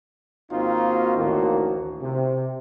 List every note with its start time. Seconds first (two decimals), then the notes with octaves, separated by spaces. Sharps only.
0.51 G#1 A#3 C4 D#4 F4 F#4
1.16 A1 D2 A2 D#3 A#3 F#4
2.02 C3